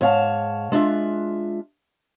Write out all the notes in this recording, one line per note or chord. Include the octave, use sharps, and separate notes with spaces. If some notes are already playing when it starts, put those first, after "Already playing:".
G#2 C#5 F5 A5
G#3 D4 F4 E5